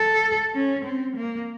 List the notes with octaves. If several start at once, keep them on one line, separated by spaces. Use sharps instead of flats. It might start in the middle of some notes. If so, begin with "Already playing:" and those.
Already playing: A4
C#4
C4
A#3